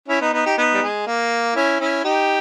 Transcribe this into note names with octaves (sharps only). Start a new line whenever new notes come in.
C#4 E4
B3 D#4
B3 D#4
D#4 G4
B3 D#4
G3
G#3
A#3
C#4 E4
C#4 E4
D#4 G4